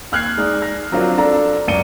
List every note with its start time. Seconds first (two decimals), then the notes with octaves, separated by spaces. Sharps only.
0.12 D#2 F6 F#6 G#6 C7
0.37 G#3 D#4 D5
0.62 F6 F#6 A#6
0.92 F3 F#3 C4 D4 F4 A#4
1.18 D4 F4 A4 D5 A#5
1.68 C#2 F#2 D5 C#7 D#7 G7